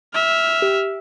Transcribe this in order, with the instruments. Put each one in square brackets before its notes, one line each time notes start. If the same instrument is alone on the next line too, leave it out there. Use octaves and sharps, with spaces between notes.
[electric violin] E5 F6
[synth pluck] G4